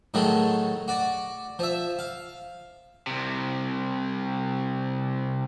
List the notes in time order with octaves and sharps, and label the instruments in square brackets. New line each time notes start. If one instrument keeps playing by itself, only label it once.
[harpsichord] A2 D#3 F#3 G#3 A3
F#4 D5
F3 E5
F5
[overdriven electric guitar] C2 C3